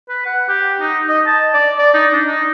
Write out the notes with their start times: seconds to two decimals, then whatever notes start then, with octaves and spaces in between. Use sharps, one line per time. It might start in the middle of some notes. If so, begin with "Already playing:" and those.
0.09 B4
0.26 F#5
0.49 G4
0.80 D#4
1.09 D#5
1.26 A5
1.54 D5
1.78 D5
1.94 D#4
2.13 D4
2.26 D#4